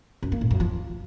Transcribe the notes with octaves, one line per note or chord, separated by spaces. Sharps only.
F#2
A#3
A2
F#2
F3